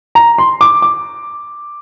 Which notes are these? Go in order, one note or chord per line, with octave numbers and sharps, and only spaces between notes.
A#5
C6
D6
D6